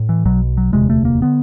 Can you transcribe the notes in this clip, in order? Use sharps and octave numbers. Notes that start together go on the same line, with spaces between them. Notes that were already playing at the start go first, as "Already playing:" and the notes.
Already playing: A2
E3
B1 B2 F#3
F#3
E1 D2 C3 G#3
A3
A#3
D3 B3